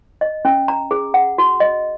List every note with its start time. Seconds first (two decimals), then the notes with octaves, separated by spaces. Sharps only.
0.21 D#5
0.45 C#4
0.68 A#5
0.91 G#4
1.14 F#5
1.38 F#4
1.60 D#5